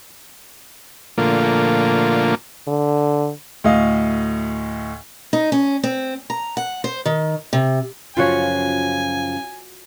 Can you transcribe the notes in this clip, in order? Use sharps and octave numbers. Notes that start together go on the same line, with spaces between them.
A#2 D3 F3 A3 A#3 F4
D3
D2 A2 D#5 F5
D#4
C#4
C4
A#5
F#5
C5
D#3
C3
F#2 C#3 F3 F4 F#4 C#5 G#5